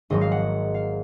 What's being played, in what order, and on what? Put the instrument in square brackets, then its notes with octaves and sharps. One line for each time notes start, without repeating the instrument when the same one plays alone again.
[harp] G#1 G#2 F#3 D#5
F5
F#5
F5